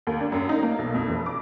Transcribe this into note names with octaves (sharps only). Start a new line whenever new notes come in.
D#2
D4
F#2
D#4
A#3
B1
F2
F1
D6